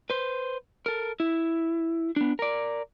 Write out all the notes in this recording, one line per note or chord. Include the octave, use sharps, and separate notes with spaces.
B4 C5
A4 A#4
E4
B3 D4
A#4 D5